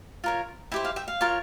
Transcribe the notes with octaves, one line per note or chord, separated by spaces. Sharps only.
F4 A#4 C#5
E4 G4 C5 E5 G5
F5
E5 G5
F5
F4 A#4 C#5